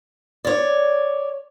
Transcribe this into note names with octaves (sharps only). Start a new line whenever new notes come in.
C#5 D5